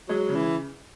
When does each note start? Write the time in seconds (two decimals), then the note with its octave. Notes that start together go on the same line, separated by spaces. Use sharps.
0.08 F#3 G#3
0.29 C#3
0.34 E3